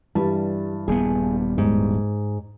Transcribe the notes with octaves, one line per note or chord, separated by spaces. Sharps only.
G2 E3 G3 A5
D#1 G3 B3 G#4
G#2